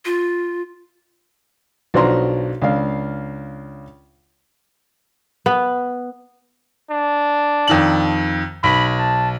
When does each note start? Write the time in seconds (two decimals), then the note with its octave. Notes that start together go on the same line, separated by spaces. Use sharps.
0.05 F4
1.94 B1 F3 D4 F#4 A#5 C6
2.62 C#2 D4 F5
5.46 B3
6.91 D4
7.67 F2 D#3 F#7
8.63 B1 B5
8.98 A5